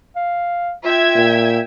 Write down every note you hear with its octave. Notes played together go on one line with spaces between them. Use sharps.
F5
F4 E5 G5 G#6
A#2